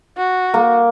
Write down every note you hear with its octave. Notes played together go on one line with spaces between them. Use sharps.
F#4
A#3